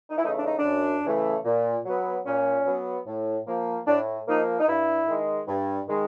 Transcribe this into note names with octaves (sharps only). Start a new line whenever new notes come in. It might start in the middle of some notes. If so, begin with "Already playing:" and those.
D#4
E4
C#3 E3 A3 D#4
D4
D#4
D4
F#2
C#3 E3 A3
A#2
F#3 B3
A#2 C#4
F#3 B3
A2
F3 A#3
A2 D4
F3 A#3 D#4
D#4
G2 E4
D#3 G#3
G2
D#3 G#3